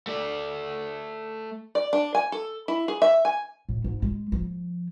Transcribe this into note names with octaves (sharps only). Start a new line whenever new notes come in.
A3 D5
D5
D4
G#5
A4
E4
G#4
E5
G#5
A2
G#2
G#3
F3